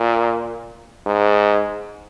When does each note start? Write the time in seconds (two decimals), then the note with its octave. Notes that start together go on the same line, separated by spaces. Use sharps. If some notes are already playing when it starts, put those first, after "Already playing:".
Already playing: A#2
1.07 G#2